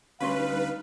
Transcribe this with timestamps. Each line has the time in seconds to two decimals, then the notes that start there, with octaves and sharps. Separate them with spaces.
0.20 D2 G3 C#4 D#4 B4 F5 C6